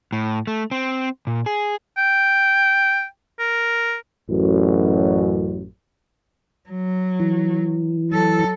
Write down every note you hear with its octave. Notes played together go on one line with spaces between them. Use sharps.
A2
A3
C4
A#2
G#4
G5
A#4
A1 F#2
F#3
E3
F#3 A4